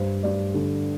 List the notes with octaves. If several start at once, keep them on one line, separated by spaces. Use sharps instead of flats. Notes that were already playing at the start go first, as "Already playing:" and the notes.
Already playing: G2 C5
G2 D5
D3